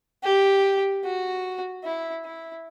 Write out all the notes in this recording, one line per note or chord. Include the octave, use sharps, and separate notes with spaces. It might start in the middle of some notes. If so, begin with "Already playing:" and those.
G4
F#4
E4
E4